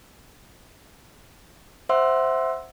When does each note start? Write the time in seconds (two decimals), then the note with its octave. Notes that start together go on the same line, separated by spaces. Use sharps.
1.89 C5 E5 F#5 C6 E6